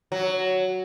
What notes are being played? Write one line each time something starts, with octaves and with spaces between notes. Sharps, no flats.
F#3